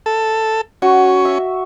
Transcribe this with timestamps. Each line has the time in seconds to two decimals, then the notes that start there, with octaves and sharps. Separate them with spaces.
0.06 A4
0.82 C#4 F#4
1.25 E5